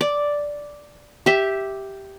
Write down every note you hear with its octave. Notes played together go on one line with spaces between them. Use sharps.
D5
G4 E5